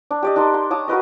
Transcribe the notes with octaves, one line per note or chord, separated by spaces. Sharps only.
D4
G4 D5 D#5
D4 D#4 A#4 C6
C6
C#5 A5 D6 D#6
F#4 A#4 B4 D#5